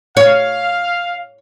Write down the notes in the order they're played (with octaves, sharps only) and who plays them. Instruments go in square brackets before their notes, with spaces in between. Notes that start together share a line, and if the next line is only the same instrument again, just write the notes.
[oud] C#5 [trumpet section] F5